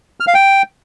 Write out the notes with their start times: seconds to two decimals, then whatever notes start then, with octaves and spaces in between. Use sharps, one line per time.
0.20 F6
0.27 F5
0.34 G5